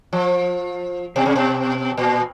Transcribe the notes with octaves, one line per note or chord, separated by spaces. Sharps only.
F3
B2
C3
B2
A#2